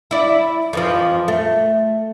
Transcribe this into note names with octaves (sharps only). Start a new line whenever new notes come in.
E4 D5
F2 E3 F3
A3